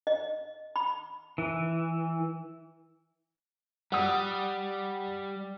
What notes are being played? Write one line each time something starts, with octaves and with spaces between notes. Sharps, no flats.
D#5
B5
E3
G3 F#5 D#6